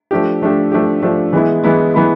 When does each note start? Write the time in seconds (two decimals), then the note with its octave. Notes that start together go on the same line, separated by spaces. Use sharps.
0.11 F3 A3 D4 G4
0.42 F3 A3 D4 G4
0.72 F3 A3 D4 G4
1.02 F3 A3 D4 G4
1.33 E3 G#3 B3 E4
1.64 E3 G#3 B3 E4
1.94 E3 G#3 B3 E4